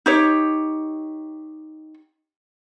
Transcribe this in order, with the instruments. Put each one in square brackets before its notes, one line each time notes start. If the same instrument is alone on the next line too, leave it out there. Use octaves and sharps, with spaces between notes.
[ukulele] D#4 G4 C#5